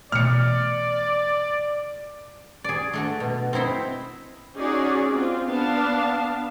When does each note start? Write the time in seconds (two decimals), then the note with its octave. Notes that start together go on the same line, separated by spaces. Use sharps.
0.12 B2 E3 A3 D5 F6 C#7
2.64 G#4 D5
2.93 A3 D4 F#4
3.20 B2
3.53 C4 D#4 E4 C5
4.56 C#4 D#4 F#4 G#4 D5
5.09 C4 F4
5.48 B3 D4 F5 A5